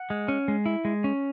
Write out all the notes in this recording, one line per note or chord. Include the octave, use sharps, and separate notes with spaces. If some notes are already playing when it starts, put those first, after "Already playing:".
Already playing: F#5
G#3
C#4
G#3
E4
G#3
C#4